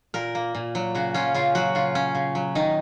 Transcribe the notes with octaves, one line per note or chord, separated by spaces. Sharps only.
A#2 A#4
A#3
A#2
F#3
C#3 F#4
C#4 F4
C#3 F4
F#3 F#4
C#3 F4
C#4
C#3
F#3
D#3 D#4